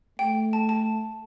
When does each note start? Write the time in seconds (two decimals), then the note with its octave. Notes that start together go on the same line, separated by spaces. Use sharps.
0.19 A3 G5
0.53 A5
0.69 A5